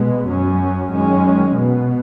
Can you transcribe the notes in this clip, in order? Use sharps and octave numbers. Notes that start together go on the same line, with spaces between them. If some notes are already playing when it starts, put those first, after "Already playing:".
Already playing: B2 G#3 B3
F#2 F#3 C#4
F#2 D#3 G#3 C#4
B2 B3